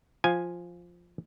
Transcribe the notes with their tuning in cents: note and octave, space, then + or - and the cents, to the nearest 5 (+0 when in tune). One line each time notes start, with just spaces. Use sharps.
F3 +0 F5 +10 G#5 +0